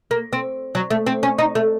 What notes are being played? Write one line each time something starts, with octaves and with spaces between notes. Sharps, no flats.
A#3
C4
F#3
A3
C4
C#4
D#4
A3